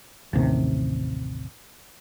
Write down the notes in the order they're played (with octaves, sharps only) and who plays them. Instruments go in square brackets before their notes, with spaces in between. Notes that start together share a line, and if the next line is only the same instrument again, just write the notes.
[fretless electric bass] A1 D#2 C3